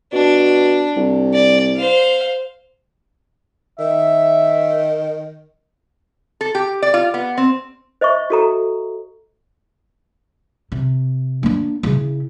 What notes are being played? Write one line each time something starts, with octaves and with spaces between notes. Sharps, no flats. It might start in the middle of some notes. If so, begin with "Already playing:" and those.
B2 D4
C2
D5
C5 F5
D#3 E5
A4
G4
D5
F4
B3
C4
C5 D#5 E5 C#6
F#4 A4 A#5
C3
A#3 D4
C#3 E4